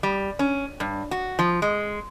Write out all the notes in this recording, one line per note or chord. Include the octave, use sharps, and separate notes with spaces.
G3
C#4
G2
F#4
F3
G#3